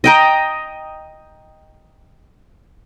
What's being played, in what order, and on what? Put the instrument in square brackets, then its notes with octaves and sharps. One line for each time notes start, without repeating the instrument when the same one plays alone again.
[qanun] D#5 G5 A#5